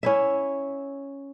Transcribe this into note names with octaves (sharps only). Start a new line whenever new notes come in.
C#4 E4 E5